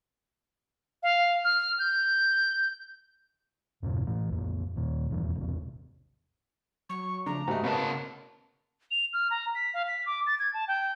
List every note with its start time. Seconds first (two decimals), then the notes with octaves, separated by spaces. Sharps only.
1.03 F5
1.44 F6
1.79 G6
3.83 E2 G2 B2 C#4
4.07 A2 E3 A3
4.29 B1 F2
4.76 D#2 A#2
5.10 D#1 E2 G2
5.35 E1 A#1 C3
6.89 F#3 C#6
7.26 C#3 F3 A3 D4 A#5
7.48 G#2 G3 A3 F#4 D#5
7.64 C#3 B3 A#4 A5
8.91 F7
9.13 F6
9.31 A#5
9.55 B6
9.74 F5
9.88 B6
10.06 D6
10.27 A6
10.40 G#6
10.54 A5
10.68 G5